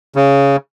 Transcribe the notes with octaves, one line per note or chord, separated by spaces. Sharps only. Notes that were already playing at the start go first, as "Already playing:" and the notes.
C#3